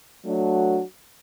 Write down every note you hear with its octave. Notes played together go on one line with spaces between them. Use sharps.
F#3 A3 D4 F#4